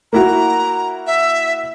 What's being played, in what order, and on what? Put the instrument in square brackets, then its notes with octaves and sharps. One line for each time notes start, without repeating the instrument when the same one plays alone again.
[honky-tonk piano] A#3 E4 F#4 [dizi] A#5
[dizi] E5